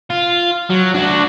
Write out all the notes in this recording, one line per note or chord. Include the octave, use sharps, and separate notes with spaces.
F4
F#3
D4 F#4